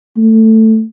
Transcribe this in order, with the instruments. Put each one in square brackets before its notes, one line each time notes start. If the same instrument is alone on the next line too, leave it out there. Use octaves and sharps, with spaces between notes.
[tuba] A3